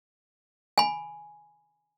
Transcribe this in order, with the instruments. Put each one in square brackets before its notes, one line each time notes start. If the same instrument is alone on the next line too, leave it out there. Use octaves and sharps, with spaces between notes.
[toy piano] G#5 B5